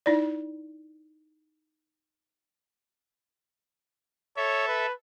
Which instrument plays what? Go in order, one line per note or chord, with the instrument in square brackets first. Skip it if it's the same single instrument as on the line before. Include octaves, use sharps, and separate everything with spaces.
[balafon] D#4 E4 D5
[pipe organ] A4 E5 [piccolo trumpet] C#5
[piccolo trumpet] B4